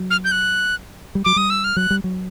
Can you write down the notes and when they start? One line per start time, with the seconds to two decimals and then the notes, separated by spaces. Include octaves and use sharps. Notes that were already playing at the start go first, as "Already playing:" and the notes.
Already playing: F#3
0.10 F6
0.25 G6
0.32 F#6
1.15 G3
1.24 F#3 D6
1.36 G3 D#6
1.50 E6
1.64 F6
1.77 F#3 F#6
1.90 G3
2.04 F#3